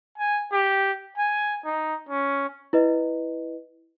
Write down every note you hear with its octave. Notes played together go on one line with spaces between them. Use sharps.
G#5
G4
G#5
D#4
C#4
E4 B4 D#5